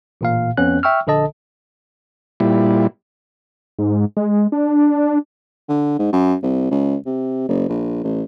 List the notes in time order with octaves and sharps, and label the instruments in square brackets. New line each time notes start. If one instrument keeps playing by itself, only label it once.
[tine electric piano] A1 A#2 F5
F2 B3 C#4 F#6
E5 G5 C#6 E6 F6
A#1 D3 A4 D#5 A5
[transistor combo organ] A#2 G3 E4
[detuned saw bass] G#2
G#3
D4
[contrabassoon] D3
G#2
F#2
C2
C#2
C3
F#1
A#1
A1